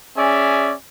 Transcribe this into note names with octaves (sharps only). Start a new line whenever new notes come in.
C#4 G#4 D5 E5 G#5